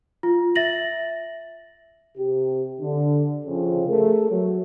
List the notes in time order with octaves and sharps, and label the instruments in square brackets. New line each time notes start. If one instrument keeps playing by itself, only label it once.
[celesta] F4
E5 A6 A#6 F#7
[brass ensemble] C3 G4
D3
F2 C#3 F3
A3 G#4 A#4
F#3